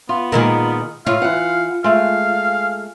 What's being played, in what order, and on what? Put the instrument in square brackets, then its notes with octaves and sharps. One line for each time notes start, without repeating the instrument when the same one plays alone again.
[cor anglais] B3 [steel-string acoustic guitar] F4
[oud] A#2 D#3 G#3
[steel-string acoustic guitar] A2 [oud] F4 [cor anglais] F5
[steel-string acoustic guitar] E3 F#5
[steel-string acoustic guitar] G#3 A3 [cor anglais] F5